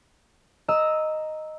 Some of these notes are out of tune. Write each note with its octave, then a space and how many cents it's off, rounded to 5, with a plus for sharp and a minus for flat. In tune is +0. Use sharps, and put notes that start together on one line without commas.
D#5 +0 A#5 +0 E6 -10